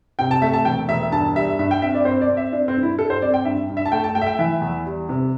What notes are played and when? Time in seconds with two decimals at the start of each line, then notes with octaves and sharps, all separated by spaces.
0.19 C3 G5
0.31 A5
0.42 A3 E5
0.53 A5
0.65 E1 G5
0.89 E1 E5
1.12 G2 A5
1.36 G3 E5
1.59 G2 E5
1.71 G5
1.82 C4 E5
1.94 D5
2.05 C4 C5
2.21 D5
2.29 C4
2.37 E5
2.53 C4 D4
2.68 C4
2.76 G2
2.83 E4
2.99 G3 A4
3.10 C5
3.22 C4 D5
3.34 G5
3.45 G2 E5
3.70 G2
3.77 E5
3.86 A5
3.92 A3 G5
4.04 A5
4.15 A3 G5
4.21 E5
4.27 G5
4.39 E3 E5
4.62 E2
4.86 G3
5.09 C3